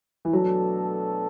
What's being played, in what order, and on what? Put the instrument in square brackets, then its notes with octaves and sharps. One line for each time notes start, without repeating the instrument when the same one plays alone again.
[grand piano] E3
[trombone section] B2 A3 D4 A4 [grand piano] F#3